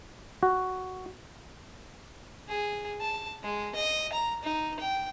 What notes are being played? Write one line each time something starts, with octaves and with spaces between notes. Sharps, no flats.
F#4
G#4
A5
G#3
D#5
A#5
D#4
G5